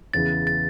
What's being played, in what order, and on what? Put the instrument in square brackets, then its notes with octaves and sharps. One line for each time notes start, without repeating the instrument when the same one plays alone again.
[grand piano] E2 C#3 E3 [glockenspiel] A6
[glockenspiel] A6